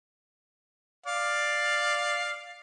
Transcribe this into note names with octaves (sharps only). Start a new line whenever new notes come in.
D5 F5